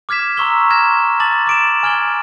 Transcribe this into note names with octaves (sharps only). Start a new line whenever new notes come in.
D6 F6 G#6 B6 E7
A#5 C6 C#6 E6 G7
F6 G#6 A#6 E7
A5 D6 A6 F#7
D6 D7 E7
G#5 F6 G#6 F#7 G7